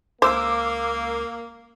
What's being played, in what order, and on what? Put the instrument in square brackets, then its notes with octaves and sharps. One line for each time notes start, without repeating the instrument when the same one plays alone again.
[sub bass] C#2 [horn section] A#3 [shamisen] C5 [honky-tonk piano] D6 E6